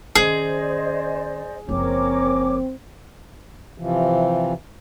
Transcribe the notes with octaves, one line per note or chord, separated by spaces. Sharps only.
D#3 C#4 G#4 C5 D5 D#5
F#1 F3 C4 A#4 C#5 D6
C3 E3 F3